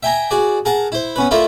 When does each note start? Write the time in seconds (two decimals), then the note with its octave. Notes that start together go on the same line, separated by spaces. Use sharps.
0.03 E5 G5 G#5 A#5
0.31 F#4 G#4 D5
0.65 G#4 A#4 F#5 A5
0.92 E4 C5
1.16 B3 C#4 B4
1.31 A3 E4 F4 A#4 D5 E5